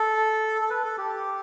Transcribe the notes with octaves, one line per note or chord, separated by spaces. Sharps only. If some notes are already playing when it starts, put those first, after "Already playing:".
Already playing: A4
A4
B4
A4
G4